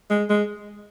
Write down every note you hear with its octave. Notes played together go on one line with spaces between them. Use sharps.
G#3
G#3